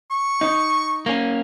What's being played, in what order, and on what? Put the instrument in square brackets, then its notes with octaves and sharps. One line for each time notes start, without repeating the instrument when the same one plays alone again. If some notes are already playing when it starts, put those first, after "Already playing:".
[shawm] C#6
[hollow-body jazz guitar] D#4
[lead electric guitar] A#3 C#4